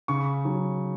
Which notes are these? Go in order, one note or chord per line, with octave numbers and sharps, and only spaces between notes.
C#3 C#6
F#3